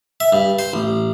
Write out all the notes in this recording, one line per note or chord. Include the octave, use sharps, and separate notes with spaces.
E5
G2
C5
A1